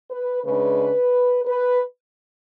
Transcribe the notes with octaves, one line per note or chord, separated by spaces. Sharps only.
B4
C#3 G#3 D4 B4
B4